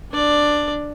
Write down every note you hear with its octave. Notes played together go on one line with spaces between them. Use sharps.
D4 D5